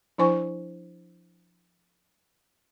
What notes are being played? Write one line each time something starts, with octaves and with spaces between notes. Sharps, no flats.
F3 D4 E4 C5 G#5 C#6